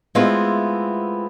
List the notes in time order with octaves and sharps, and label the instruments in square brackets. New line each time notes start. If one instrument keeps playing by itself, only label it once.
[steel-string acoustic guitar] G#3 A3 B3 C4 E4 F4